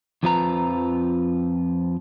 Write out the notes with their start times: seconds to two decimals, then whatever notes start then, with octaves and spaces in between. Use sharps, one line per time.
0.23 F2 F3 C4 F4 B4 A#5